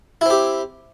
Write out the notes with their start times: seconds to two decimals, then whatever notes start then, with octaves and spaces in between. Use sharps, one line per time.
0.21 E4
0.26 C4
0.30 G4